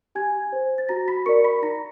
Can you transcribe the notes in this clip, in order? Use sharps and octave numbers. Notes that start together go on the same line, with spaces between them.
G4 G#5 G#6
C5
A6
F#4 A#5 A#6
B5 B6
A#4 D5 C#6 C#7
B5 B6
D#4 A#5 A#6